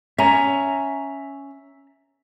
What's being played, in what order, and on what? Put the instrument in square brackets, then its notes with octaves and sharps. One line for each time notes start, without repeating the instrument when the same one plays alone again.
[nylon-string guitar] C#4 [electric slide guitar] E5 A#5